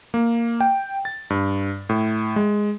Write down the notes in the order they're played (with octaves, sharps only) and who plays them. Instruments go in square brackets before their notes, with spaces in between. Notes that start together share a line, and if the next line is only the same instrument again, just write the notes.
[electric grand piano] A#3
G5
A6
G2
A2
G#3